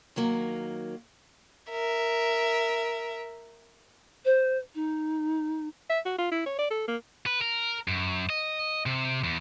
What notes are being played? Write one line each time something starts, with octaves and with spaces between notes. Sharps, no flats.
D#3 F#3 A#3
A#4 E5
C5
D#4
E5
F#4
F4
E4
C#5
D5
A4
A#3
B4
A#4
F#2
D#5
C3
E2